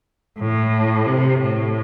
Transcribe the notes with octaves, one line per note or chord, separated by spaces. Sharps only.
A2
C3
A2